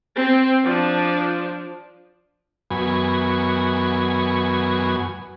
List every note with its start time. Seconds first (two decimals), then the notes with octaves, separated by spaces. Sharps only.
0.16 C4
0.65 F3 D4
2.71 F#2 B3 G#5